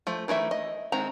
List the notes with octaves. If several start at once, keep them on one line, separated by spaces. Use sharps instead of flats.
F3 A3
D#3 E3 A3 E5
D#5
D#3 G#3 C4 A#5